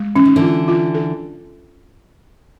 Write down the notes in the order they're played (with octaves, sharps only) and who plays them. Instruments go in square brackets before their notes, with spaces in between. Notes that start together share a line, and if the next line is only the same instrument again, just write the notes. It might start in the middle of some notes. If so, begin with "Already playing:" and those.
Already playing: [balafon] G#3
[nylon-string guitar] E3 [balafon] C#4
[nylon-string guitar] D#3
D3 E3
[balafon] F4
F4
A4